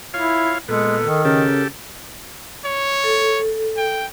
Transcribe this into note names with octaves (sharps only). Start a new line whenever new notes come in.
E4 F4 C#5 F5
A#2 G#3 B3 A4
D#3
C#3 G4 A4 A#4
C#5
A4
G5